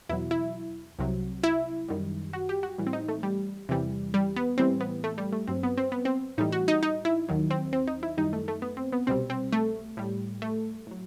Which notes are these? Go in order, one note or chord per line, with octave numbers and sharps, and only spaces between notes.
E2 B2 F#3 E4
E4
C2 C3 F#3
E4
F#2 D#3 G3
F#4
G4
F#4
A2 E3 G3
C4
D#4
A3
G3
E2 C3 E3 G3
G3
B3
A2 E3 G3 C4
B3
A3
G3
A3
G2 F#3 C4
B3
C4
B3
C4
A2 E3 G3 D#4
F#4
D#4
D#4
E4
D#2 D#3 F#3
C4
C4
D#4
E4
F#2 D#3 G3 D#4
A3
A3
B3
C4
B3
C2 B2 G3 C4
C4
A3
A2 G3
A3
A2 F#3